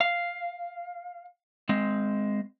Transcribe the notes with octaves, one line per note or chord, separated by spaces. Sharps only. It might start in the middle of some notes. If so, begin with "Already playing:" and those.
F5
G#3 C4